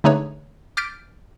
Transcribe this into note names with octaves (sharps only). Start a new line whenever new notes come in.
D3 A3 D#4 G#4 B4 C#5
D6 F6 G6 A6 B6 D7